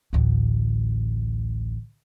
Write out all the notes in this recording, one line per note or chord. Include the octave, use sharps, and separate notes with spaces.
A1 D2